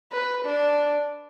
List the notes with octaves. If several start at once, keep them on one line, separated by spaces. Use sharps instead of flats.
B4
D4